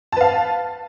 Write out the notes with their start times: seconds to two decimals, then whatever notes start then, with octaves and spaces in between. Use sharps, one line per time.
0.12 A5
0.17 B4
0.21 F5